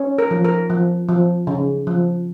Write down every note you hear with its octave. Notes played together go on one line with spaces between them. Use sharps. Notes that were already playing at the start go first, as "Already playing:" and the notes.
Already playing: C#4
A#4
F3
A#4
F3
F3
C#3
F3